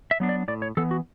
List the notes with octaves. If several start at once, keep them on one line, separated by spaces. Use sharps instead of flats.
E5
F#3 B3 D4
D5
A2 D5
C#5
E3 B3 A4
F#4